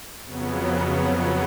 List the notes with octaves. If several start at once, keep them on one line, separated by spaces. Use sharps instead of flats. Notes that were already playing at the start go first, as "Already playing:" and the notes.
F2 C#3 F#3 B3